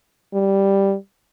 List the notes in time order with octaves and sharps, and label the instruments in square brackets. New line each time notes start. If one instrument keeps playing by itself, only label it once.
[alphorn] G3